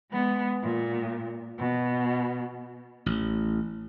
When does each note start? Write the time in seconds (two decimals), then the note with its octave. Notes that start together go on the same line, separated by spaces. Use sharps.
0.11 G#3 B3
0.63 A#2
1.59 B2
3.06 A1